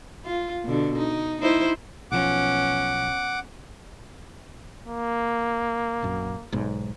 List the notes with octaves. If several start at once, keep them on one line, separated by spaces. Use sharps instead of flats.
F4
B2 D3
D#4
D#4 E4 C5
B1 F3 B3 C#4 F#5 D6
A#3
A#1 F#2
B1 G#2